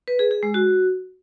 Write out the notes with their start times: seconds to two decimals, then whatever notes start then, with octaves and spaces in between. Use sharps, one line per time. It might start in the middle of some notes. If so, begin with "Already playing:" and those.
0.08 B4
0.19 G#4
0.31 G#4
0.43 G#3
0.54 F#4